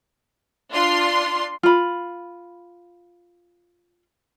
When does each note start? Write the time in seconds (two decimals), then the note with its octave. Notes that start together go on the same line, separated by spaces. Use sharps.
0.71 D4 F4 C6
1.63 F4 B5